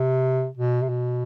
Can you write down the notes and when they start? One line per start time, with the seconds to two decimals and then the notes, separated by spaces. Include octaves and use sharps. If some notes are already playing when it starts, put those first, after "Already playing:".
Already playing: C3
0.57 B2
0.82 C3
0.89 B2